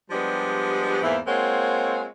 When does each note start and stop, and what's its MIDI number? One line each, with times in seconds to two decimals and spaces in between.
0.11 1.00 53
0.11 1.00 55
0.11 1.00 56
0.11 1.00 59
0.11 1.00 62
0.11 1.00 67
1.02 1.18 40
1.02 1.18 44
1.02 1.18 52
1.02 1.18 58
1.02 1.18 72
1.02 1.18 76
1.27 2.05 56
1.27 2.05 58
1.27 2.05 60
1.27 2.05 65
1.27 2.05 73
1.27 2.05 78